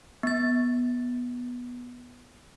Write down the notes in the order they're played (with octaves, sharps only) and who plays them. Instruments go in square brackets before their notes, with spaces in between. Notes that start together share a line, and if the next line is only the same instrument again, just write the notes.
[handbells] B3 A6